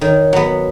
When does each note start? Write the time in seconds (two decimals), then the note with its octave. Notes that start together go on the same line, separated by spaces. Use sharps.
0.01 D#3 C#5
0.33 F#3 B3